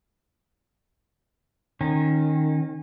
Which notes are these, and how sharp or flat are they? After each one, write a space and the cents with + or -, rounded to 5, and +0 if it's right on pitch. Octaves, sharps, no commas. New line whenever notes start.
D#3 -15 C#4 -30